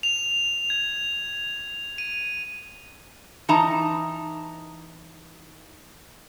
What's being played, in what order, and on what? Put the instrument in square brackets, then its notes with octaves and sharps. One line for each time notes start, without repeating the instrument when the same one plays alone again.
[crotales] F7
G#6
D#7
[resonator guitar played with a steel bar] E3 D#4 A5 A#5